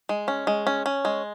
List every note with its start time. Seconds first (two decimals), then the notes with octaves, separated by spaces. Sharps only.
0.09 G#3
0.28 C#4
0.47 G#3
0.67 C#4
0.86 C#4
1.05 G#3